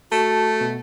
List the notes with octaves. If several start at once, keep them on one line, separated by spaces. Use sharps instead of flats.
A3 F#4 A5
B2